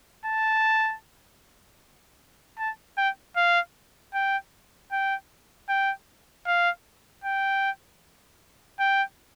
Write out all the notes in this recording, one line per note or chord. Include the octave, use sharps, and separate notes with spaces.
A5
A5
G5
F5
G5
G5
G5
F5
G5
G5